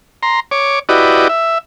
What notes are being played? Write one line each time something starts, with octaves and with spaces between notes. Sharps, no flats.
A#5 C6
C#5 D6
E4 F#4 G4 B4 D5 D#5
E5